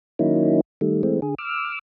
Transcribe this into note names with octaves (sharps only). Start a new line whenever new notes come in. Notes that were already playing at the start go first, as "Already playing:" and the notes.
D#3 F#3 A#3 C#4 D#4 E4
D#3 G3 A3
E3 G#3 A3 C4
D3 G#4
D6 E6 F6